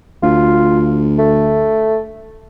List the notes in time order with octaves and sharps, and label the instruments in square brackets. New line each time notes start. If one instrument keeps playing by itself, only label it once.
[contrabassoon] D2 [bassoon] F4
[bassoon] A3